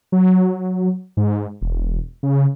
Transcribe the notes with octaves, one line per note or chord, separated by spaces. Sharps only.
F#3
G#2
E1
C#3